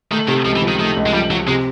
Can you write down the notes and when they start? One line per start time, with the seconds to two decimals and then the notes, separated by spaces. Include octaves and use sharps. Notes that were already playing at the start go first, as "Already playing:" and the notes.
0.11 D#3 A3
0.28 C3 D#3
0.45 C#2 F3
0.56 E3
0.62 F3
0.68 D#3
0.80 D#3 A3
0.97 C#2
1.06 G#3
1.13 F3 G3
1.30 F3 F#3
1.47 C3 G#3